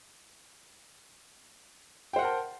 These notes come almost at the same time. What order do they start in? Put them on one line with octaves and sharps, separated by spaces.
G5 C5 F#5 A#4 A5